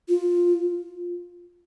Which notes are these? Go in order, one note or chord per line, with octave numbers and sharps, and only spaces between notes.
F4